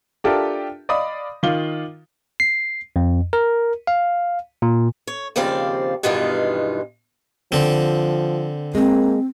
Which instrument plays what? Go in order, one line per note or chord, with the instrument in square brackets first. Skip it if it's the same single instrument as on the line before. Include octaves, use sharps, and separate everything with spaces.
[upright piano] D4 F4 G4 A4 A#4 E5
D5 D#5 F5 B5 D#6
D#3 F4 F5 D6 G7
[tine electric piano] C7
F2
A#4
F5
A#2
[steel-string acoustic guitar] C#5
D#2 C#3 F3 C4 D5 F5
G2 B2 D#3 E3 G#3 F4
[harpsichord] D3 C4 [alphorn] F3
[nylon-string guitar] G#3 [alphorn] A#3 [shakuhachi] C4